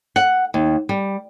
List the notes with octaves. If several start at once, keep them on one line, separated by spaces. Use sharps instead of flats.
F#5
D#2
G3